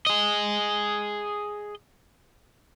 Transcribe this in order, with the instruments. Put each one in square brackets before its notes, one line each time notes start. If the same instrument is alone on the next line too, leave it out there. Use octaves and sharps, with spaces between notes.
[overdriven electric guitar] G#4 D#5